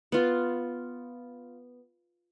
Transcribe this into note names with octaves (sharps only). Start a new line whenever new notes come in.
B3 F4